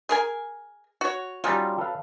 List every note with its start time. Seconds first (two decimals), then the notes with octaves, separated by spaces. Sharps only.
0.09 G#4 A#4 G#5
1.01 F#4 C#5
1.44 F#3 G3 C#4 D#4 F4
1.78 A4 B4 F5